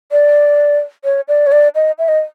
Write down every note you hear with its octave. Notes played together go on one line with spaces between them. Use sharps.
D5
C#5
D5
C#5
D5
D#5
E5
D#5